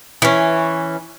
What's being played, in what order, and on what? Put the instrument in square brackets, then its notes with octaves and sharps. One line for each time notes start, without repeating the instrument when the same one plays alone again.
[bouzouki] E3 C#4